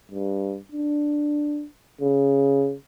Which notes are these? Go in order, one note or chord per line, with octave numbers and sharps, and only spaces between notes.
G2
D4
C#3